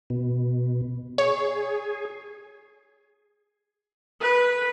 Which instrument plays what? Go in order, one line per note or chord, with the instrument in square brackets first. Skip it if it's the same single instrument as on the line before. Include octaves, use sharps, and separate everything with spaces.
[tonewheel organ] B2
[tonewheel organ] G#4 [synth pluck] C#5
[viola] B4